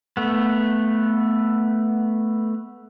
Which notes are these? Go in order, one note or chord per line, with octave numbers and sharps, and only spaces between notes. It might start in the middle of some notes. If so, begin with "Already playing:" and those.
A3 B3